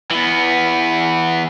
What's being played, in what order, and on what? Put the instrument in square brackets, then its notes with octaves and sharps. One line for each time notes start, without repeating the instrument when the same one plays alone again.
[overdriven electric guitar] E3 B3